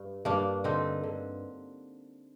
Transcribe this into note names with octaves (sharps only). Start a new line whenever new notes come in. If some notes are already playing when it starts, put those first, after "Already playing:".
Already playing: G2
G2 A#3 D4
D3 C4 D#4
D3